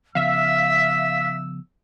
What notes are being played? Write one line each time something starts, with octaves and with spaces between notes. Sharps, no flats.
C#3 F3 B3 E5 F5 E6 B6